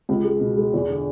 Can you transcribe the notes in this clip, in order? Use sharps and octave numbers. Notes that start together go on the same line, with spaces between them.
C#2
G#3
B2
G#3
E2
D3